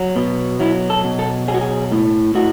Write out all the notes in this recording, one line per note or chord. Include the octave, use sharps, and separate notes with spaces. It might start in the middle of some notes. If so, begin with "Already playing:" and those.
Already playing: F#3
B2
F#3 E4
A4
B2
A4
F#3 G#4
F#4
G#4
A2
A2 F#4